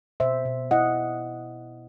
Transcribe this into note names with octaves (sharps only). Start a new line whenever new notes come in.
B2 C5 E5
B2
E4 D#5 F#5